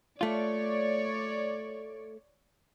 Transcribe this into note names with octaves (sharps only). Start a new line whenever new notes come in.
A3 F4 C#5 D5